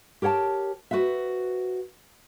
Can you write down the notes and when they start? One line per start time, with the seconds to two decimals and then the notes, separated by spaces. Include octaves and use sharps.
0.22 G4 A#4 C#5 F#5 A5
0.91 F#4 B4 C5 E5